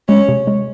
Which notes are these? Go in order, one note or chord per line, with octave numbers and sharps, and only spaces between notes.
G#3 C#4
C3
G#3